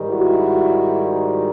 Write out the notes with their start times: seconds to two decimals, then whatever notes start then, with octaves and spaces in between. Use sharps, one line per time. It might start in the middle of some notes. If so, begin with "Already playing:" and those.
Already playing: G#2 D#3 G3
0.10 E4 F#4